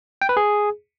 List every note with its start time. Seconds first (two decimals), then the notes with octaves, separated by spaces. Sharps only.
0.22 G5
0.29 B4
0.37 G#4